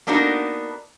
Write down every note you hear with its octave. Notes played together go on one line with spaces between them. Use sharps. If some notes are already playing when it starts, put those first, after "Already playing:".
A#3 B3 D4 D#4 F#4 A#4